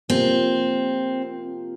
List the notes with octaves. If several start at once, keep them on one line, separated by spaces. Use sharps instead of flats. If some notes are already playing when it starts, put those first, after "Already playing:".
C3 F3 A#3 C4